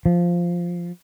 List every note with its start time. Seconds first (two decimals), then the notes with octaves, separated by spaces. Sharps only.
0.06 F3